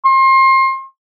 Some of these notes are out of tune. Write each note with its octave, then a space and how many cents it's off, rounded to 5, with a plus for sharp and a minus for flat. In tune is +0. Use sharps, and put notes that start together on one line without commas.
C6 +30